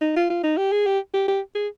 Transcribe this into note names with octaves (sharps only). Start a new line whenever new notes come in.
D#4
F4
F4
D#4
G4
G#4
G4
G4
G4
G#4